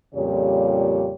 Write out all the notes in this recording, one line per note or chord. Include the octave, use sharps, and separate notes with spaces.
F2 A#2 C#3 G3 G4 C#5